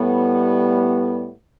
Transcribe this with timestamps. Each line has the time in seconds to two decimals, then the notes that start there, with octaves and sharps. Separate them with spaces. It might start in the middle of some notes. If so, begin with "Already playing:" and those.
Already playing: A2 G3 B3